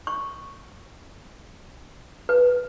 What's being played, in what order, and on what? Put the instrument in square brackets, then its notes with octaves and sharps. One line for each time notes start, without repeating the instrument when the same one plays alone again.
[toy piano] C#6
B4